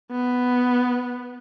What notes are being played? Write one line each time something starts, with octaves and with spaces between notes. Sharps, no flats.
B3